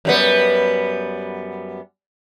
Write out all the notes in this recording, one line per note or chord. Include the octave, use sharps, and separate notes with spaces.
F#2 G3 B3